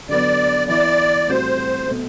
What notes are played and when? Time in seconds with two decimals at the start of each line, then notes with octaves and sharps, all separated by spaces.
0.09 D3 F#3 B3 D5
0.68 E3 B3 E4 D5
1.28 A2 G3 C4 F#4 C5
1.87 B2 A3